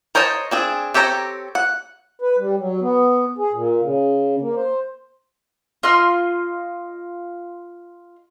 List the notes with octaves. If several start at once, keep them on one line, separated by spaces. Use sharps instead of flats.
A#4 C5 C#5 D#5 A5
C4 D4 G#4
C4 G4 A4 C#5 A#5
F#5
B4
G3
F#3
B3
G#4
A#2
C#3
A#3
C5
F4 D#5 C6 F6